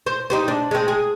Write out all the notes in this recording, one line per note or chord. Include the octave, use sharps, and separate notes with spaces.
C5
D#4 G4 C5
D4
G#3 C4
G#4